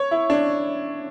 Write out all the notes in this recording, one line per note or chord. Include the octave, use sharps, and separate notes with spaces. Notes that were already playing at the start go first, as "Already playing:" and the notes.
Already playing: C#5
E4
D4